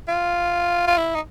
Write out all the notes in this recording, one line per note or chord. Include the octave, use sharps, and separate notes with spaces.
F4
F4
E4
D#4